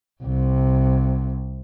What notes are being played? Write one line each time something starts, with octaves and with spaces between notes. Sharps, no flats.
C2 C3